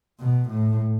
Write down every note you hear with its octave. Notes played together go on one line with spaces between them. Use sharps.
B2
A2